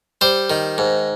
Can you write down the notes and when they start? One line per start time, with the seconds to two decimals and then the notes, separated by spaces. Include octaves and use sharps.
0.21 G3 C5
0.50 D#3
0.78 G#2